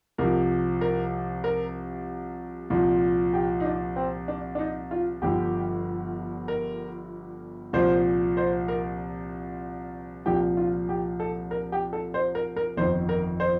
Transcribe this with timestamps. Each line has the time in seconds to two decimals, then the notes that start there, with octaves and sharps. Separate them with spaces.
0.18 C2 C3 F3 A#4
0.81 A#4
1.44 A#4
2.70 C2 A#2 F3
3.33 G4
3.60 D#4
3.65 D4
3.96 C4
4.28 D4
4.55 D4
4.59 D#4
4.91 F4
5.22 G1 G2 D3 F3 G4
6.48 A#4
7.73 C2 A#2 F3 C5
8.37 C5
8.68 A#4
10.26 C2 A#2 F3 G4
10.57 F4
10.89 G4
11.20 A4
11.51 A#4
11.72 G4
11.93 A4
12.14 C5
12.35 A#4
12.56 A#4
12.77 G1 F2 D#3 C5
13.09 A#4
13.40 C5